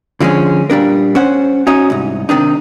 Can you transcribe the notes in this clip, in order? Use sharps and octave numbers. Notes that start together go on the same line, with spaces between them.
D3 F3 G#3 C4 C#4
A#2 G3 D4 A#4
C#4 C5 F#5
C#4 D#4 F#4 D#5
C2 G#2
C3 D#3 D4 D#4